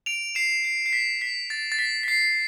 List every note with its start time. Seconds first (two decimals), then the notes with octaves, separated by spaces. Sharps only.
0.06 D7 F7
0.35 C7 E7
0.64 C7
0.86 C7
0.93 B6
1.21 B6
1.50 A6
1.72 A6
1.79 B6
2.03 B6
2.08 C7